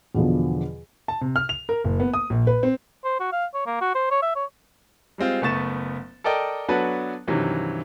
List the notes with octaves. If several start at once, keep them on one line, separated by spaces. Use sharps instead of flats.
E2 B2 D3 F3
A5
C3
F6
F7
A#4
F#1
B3
D#6
A#1
B4
C4
C5
F#4
F5
C#5
A#3
F#4
C5
C#5
E5
C#5
G3 G#3 C4 F4
F#1 A3 B3 C#6 A6 E7
A4 A#4 D5 D#5 G5
F#3 B3 D4 F#4 A4 B4
G2 C3 D#3 E3 F#3